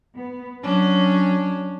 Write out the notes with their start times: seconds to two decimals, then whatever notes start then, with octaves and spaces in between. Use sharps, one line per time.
0.16 B3
0.63 F#3 C#4 D4